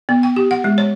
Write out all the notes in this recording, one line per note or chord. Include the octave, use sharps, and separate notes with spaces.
B3
G5
G4
F#5
G#3
C#5